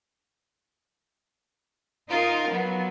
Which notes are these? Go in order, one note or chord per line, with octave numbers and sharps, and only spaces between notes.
D#4 F4 A#4
F#3 B3